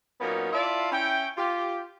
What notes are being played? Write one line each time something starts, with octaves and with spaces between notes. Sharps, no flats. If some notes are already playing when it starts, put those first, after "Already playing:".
A#2 F#3 A#3 B3 C#4 D#4
E4 F4 D5 E5 F5 A5
C#4 E4 G5
F4 G4